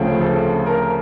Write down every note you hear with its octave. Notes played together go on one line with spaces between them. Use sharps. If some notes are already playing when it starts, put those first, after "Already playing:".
Already playing: D2 C#3 F3 A3 C4
A4
A#4